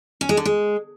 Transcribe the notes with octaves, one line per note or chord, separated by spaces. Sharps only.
C#4
G#3
D3
G#3